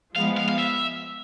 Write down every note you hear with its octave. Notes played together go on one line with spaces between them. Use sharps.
F3 G#3 B3 F5
F5
F5
E5